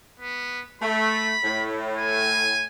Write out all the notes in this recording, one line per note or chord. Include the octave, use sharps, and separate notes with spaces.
B3
A3 B5
A2
G#5